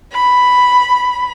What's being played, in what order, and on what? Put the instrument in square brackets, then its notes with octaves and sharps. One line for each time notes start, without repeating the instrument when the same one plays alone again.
[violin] B5